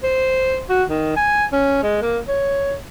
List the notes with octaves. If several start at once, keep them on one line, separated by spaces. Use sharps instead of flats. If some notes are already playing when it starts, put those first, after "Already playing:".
C5
F#4
D#3
G#5
C#4
G#3
A#3
C#5